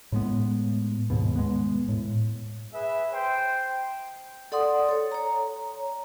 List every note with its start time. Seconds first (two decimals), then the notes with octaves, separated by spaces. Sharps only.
0.12 A2 G#3 B3
1.10 D#2 G#2 B2
1.36 G#3 B3
1.88 A2
2.73 G#4 B4 E5
3.13 C5 G5
4.52 A4 D5 F#5 C6 D#6
4.89 A4 C#5
5.12 C#5 A#5